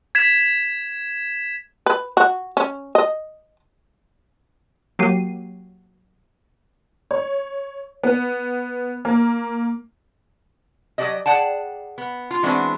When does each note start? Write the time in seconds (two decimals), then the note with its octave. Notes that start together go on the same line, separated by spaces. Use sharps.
0.15 G#6 B6 E7
1.86 B4
2.17 F#4
2.57 C#4
2.95 D#5
4.99 F#3 A#3 G4 C7 D#7
7.11 C#5
8.03 B3
9.05 A#3
10.98 F#3 G3 G4 D5 D#5
11.26 G#4 D5 F#5 G5 A5
11.98 B3
12.31 F4
12.43 E3 G#3 B3 C4 D4 F#4